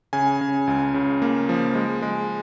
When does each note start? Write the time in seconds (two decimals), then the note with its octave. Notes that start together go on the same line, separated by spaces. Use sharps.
0.13 C#3 G#5
0.41 C#3
0.67 C#2
0.94 C#3
1.22 A#3
1.49 F3
1.75 G#3
2.02 G#3